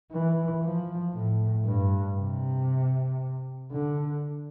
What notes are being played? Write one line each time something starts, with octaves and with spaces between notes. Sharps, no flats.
E3
F3
A2
G2
C3
D3